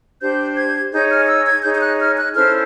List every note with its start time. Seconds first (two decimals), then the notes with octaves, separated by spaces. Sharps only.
0.21 D4 G4 C5 G6
0.57 G#6
0.92 D#4 G#4 C#5 G6
1.10 F6
1.28 E6
1.46 G#6
1.63 D#4 G#4 C#5 G6
1.74 G6
1.81 F#6
1.99 F6
2.17 F#6
2.35 C#4 E4 A4 C5 F6